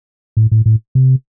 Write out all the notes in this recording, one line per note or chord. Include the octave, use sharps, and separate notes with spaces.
A2
A2
A2
C3